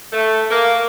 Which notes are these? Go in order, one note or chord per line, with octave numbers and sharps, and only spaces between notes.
A3
A#3